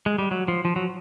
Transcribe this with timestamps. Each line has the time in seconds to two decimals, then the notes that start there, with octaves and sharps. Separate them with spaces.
0.06 G#3
0.18 G3
0.31 F#3
0.48 F3
0.65 F3
0.76 F#3